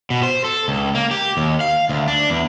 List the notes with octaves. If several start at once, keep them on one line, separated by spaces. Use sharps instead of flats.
B2
C5
A4
C#2
A#3
G4
D#2
F5
D2
D4
E2